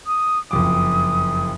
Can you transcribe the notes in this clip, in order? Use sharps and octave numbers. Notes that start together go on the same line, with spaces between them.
D#6
F#1 F2 D6 D#6